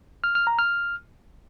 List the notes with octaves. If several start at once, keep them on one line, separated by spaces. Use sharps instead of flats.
F6
F6
A#5
F6